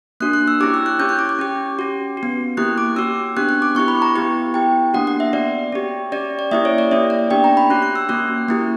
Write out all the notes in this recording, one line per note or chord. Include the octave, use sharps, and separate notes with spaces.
A#3 D4 F#4 F#6
F#6
E6
C#4 E4 G4 D6
E6
F#6
C#4 E4 G4 G6
F#6
D6
D6
C#4 G4
C#4 F#4
F#4
B3
A#3 E4 G4 F#6
D6
C#4 F#4 E6
B3 D4 G4 F#6
F#6
D6
B3 E4 G4 C#6
B5
A#5
B3 E4 G4
B3 E4 G4 G5
A#3 D4 F#4 F#5
F#5
E5
B3 F#4 D5
C#4 G4
C#4 G4 D5
D5
A#3 E4 G4 E5
C#5
D5
A#3 C#4 E4 E5
D5
B3 D4 G4 G5
A#5
B5
C#4 F#4 F#6
F#6
E6
A#3 C#4 F#4 F#6
A#3 E4 G4